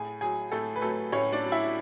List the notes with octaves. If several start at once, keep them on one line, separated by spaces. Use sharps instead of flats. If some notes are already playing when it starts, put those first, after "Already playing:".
Already playing: A2 G#4 G#5
F#3 G#4 G#5
A2 A3 A4
B4
F#3 A3 A4
A2 C#4 C#5
D4 D5
F#3
E4 E5